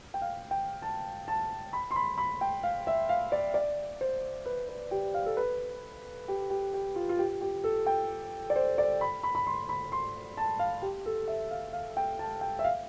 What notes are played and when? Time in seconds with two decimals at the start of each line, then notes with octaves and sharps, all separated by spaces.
0.14 G5
0.22 F5
0.51 G5
0.82 A5
1.28 A5
1.73 B5
1.91 C6
1.96 B5
2.18 B5
2.41 G5
2.63 F5
2.87 E5
3.09 F5
3.32 D5
3.54 D5
4.01 C5
4.46 B4
4.69 B4
4.91 G4
5.14 F5
5.26 A4
5.37 B4
6.28 G4
6.50 G4
6.74 G4
6.96 F4
7.09 F4
7.19 G4
7.41 G4
7.64 A4
7.87 G5
8.50 D5
8.56 C5
8.78 D5
9.01 B5
9.23 B5
9.35 B5
9.47 C6
9.69 B5
9.92 C6
10.37 A5
10.59 F5
10.82 G4
11.06 A4
11.28 E5
11.51 F5
11.73 F5
11.97 G5
12.19 A5
12.41 G5
12.59 E5
12.64 F5